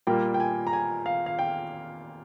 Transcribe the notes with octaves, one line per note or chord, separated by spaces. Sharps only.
A#2 G3 A#3 G5
G5
G#5
A#5
G#5
F5
F5
G5